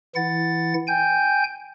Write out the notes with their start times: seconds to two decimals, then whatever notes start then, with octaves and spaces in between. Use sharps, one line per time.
0.16 E3 E4 F#5 A6
0.88 G5 G#5 G6